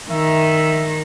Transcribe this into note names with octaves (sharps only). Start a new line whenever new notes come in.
D#3 E5